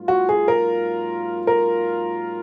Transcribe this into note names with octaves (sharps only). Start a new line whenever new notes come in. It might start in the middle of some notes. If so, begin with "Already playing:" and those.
Already playing: G#2 F#3 A#3 F4
F#4
G#4
A#4
A#4